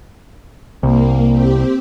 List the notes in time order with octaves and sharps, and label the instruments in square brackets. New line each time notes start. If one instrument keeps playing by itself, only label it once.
[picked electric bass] C2 [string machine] A#3
[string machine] C4 G4